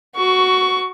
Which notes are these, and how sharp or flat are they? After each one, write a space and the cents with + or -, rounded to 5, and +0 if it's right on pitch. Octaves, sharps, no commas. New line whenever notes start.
F#4 +0 C#6 +20